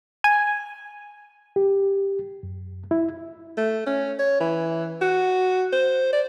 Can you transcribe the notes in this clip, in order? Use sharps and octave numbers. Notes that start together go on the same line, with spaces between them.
G#5
G4
F#2
E4
A3
C#4
C#5
E3
F#4
C5
D5